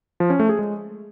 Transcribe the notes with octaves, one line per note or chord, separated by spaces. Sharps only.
F3
C#4
A3
G#4
G#3